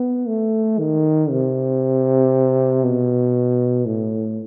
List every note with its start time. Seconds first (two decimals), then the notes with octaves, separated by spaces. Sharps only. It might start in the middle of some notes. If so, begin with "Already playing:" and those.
Already playing: B3
0.28 A3
0.79 D#3
1.30 C3
2.84 B2
3.86 A2